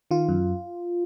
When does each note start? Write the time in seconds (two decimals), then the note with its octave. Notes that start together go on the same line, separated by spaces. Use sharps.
0.11 D#3 F4
0.29 F#2